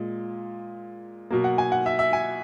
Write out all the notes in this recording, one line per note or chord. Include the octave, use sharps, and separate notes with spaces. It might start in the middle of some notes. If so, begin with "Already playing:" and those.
Already playing: A#2 G#3
B2 F#3 A#3
F#5
G#5
F#5
E5
E5
G#5